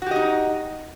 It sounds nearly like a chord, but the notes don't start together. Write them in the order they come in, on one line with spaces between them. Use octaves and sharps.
F#4 G4 D#5 D#4